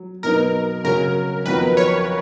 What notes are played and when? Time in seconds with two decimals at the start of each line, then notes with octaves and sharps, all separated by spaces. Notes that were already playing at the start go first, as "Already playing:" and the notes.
Already playing: F#3
0.23 B2 F#3 B3 D#4 A#4
0.84 C#3 F#3 C#4 F#4 A#4
1.46 F2 D#3 F#3 B3 F#4 B4
1.77 C#5